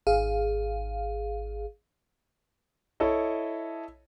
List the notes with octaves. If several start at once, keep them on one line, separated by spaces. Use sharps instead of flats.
G#1 G#4 F5
E4 A4 C#5 D#5